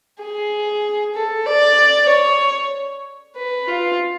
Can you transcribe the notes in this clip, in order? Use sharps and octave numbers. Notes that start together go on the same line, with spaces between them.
G#4
A4
D5
C#5
B4
F4